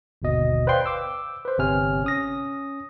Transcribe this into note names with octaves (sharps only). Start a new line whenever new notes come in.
G1 D#2 B2 D#5
B4 C5 D5 F5 G5 C6
D6 E6
B4 C5
G1 C3 C#5 G#5 F6
C#4 D#6 A#6